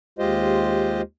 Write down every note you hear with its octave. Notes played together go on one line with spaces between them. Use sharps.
D#2 G#3 F4 G4 C5 D#5